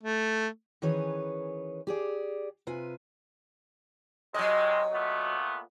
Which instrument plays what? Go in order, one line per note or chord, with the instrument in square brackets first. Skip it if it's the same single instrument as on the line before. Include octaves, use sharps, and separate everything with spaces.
[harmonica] A3
[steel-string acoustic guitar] D#3 E3 C#4 G#4 B4 C#5
G4 G#4 D5
C3 F4 B4 G#5
[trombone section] C3 D#3 G#3 [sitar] F#3 D#5
[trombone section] A#2 A3 B3